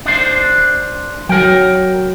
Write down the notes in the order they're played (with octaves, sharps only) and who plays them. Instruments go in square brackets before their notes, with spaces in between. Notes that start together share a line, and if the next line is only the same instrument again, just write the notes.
[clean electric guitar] D4 C5
[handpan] F#3 [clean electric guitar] A#4 G5